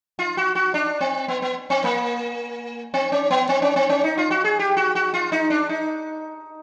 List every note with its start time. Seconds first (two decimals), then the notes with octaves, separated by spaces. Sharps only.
0.19 F4
0.37 F#4
0.55 F#4
0.74 D4
1.01 C4
1.28 B3
1.42 B3
1.70 C4
1.84 A#3
2.94 C4
3.12 C#4
3.31 B3
3.49 C4
3.62 C#4
3.76 C4
3.89 C#4
4.04 D#4
4.18 F4
4.31 F#4
4.44 G#4
4.59 G4
4.77 F#4
4.95 F#4
5.14 F4
5.32 D#4
5.50 D4
5.69 D#4